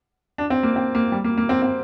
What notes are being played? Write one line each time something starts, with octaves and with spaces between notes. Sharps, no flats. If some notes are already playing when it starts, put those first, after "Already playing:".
D4
C4
A#3
C4
A#3
G3
A#3
A#3
C4
C4